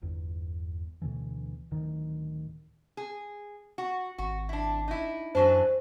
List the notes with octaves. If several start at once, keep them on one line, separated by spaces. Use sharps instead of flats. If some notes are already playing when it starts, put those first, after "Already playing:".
G1 E2
D2 B2 D3 E3
D1 D#3
G#4
F#4
G#1 F#4
D4 E4
D#4 E4
F#2 E3 F#3 D4 C5